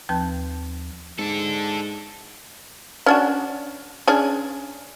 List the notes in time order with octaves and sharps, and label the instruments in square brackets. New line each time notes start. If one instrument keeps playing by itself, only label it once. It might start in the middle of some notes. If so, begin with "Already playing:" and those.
[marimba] D#2 F3 C4 B4 A5 G6
[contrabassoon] G#2 [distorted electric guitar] D4 A4
[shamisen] C#4 D4 F#4
C#4 D4 G#4